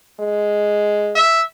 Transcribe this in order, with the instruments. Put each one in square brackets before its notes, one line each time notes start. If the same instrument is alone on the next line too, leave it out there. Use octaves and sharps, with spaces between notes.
[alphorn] G#3
[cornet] E5